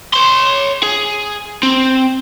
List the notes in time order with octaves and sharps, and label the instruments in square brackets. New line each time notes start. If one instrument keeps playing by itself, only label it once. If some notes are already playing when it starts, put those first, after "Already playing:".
[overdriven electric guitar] C#5 C6
G#4
C4